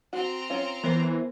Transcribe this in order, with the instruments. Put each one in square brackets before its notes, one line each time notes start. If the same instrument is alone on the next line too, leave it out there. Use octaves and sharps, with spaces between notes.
[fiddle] C4 A#5 [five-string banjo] F#4
[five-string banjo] C#4 F4
[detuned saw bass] E3 [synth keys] B3 A#4 C5